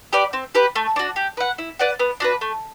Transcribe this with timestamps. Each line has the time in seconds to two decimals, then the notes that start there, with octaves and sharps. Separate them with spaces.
0.13 G4 B4 D5
0.33 C4
0.55 G4 B4
0.75 A3
0.96 D4 F#4
1.16 G4
1.37 B4 F#5
1.58 E4
1.79 B4 D5 F#5
1.99 B3
2.20 D4 F#4 B4
2.41 A3